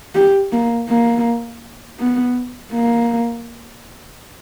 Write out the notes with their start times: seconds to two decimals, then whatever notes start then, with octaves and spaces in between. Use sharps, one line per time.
0.15 G4
0.52 A#3
0.89 A#3
2.00 B3
2.73 A#3